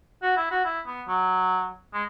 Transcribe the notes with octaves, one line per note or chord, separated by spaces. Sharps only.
F#4
E4
F#4
E4
B3
F#3
G#3